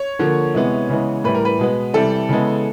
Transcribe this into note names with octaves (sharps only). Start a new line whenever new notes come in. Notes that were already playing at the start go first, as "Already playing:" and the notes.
Already playing: C#5
D3 F3 A#3
C3 E3 G#3 B3
C#3 E3 G#3 B3
A2 E3 G3 B4
A#4
B4
B2 G#3 B3
C3 E3 G3 A4
C#3 E3 G#3 B3